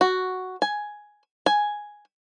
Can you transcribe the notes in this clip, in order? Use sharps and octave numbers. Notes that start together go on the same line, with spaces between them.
F#4
G#5
G#5